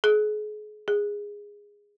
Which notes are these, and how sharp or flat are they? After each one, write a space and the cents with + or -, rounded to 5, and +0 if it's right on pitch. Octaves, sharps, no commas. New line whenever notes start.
G#4 +35
G#4 -15